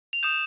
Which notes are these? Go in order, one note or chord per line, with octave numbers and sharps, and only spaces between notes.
F7
D#6 G6 E7